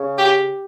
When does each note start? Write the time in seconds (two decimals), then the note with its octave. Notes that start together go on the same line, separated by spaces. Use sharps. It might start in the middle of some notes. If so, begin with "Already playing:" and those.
Already playing: C#3
0.18 G4